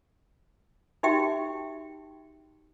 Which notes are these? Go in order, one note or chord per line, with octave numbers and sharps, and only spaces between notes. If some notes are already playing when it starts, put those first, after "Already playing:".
D#4 F#4 G4 E5 G5